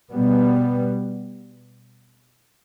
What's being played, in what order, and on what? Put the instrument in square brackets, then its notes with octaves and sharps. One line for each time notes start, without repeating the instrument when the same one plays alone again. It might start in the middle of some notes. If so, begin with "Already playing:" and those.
[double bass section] B2 G3 B3